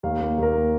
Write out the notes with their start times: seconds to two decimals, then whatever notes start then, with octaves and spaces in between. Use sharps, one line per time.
0.03 D#2 F5
0.21 A#3
0.38 D#2 A#4
0.55 A#3